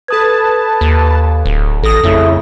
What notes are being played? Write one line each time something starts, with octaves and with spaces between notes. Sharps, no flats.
A4 B4 A5 D#6 G#6
D#2
D1
A1 A4 D#6 A#6
F2 C#3 A3 E4